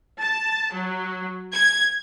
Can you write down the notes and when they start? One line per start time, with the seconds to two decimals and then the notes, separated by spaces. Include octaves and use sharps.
0.20 A5
0.73 F#3
1.53 G#6